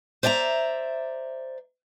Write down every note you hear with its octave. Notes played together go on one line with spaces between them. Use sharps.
C5 D5 E5 G#5 A#5